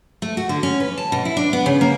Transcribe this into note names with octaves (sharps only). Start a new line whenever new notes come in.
A3
F#4
D3
C#4
B4
A5
B2
E4
D4
B3
C#3
A#3